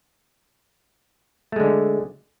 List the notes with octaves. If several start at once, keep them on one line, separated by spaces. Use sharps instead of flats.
D3 G#3 A3